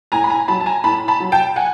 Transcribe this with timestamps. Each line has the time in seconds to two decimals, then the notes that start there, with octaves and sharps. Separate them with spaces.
0.12 A2 G#5 A#5
0.24 B5
0.30 G#5 A#5
0.48 F#3 A5 B5
0.60 A5
0.66 G#5 A#5
0.84 A2 A5 B5
1.08 A5 B5
1.20 F#3
1.32 G5 A5
1.56 F#5 G#5